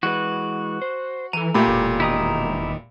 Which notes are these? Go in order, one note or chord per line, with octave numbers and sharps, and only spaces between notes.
E3 G#3 F#4 B4
C5
E3 A4 A#5 D#7
A#2 A3 G4 B5
E1
D#3 E4 D#5 G5 A#5 D#6